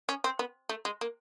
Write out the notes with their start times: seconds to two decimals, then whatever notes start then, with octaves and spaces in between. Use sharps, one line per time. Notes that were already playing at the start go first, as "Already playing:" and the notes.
0.09 C#4
0.24 C4
0.39 B3
0.69 A3
0.85 G#3
1.01 A#3